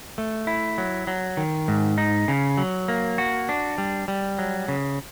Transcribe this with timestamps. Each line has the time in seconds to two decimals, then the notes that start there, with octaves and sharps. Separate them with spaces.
0.18 A3
0.47 E4
0.78 F#3
1.07 F#3
1.37 D#3
1.68 G#2
1.98 D#4
2.28 C#3
2.58 F#3
2.88 A#3
3.18 F#4
3.49 D4
3.78 G3
4.08 G3
4.38 F#3
4.68 C#3